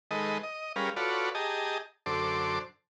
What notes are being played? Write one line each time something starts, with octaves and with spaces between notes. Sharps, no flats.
D#3 G#3 A4 B4 D#5
D#5
G3 C#4 G#4 A#4 B4 F5
F4 F#4 A4 B4 C#5 D5
G4 G#4 D#5 A5 A#5
F#2 D3 A4 C5 D6